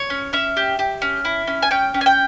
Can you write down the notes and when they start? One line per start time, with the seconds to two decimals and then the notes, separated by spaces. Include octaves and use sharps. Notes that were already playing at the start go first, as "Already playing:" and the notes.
Already playing: C#5
0.10 C#4
0.33 C#4 E5
0.57 G4
0.79 G4
1.02 C#4
1.25 E4
1.48 C#4
1.62 G#5
1.71 C#4 G5
1.94 C#4
2.01 G#5
2.06 G5